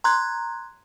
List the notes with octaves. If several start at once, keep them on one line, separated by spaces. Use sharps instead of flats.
A#5 C6 F#6 G#6